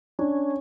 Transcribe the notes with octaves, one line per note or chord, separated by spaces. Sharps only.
C#4 D4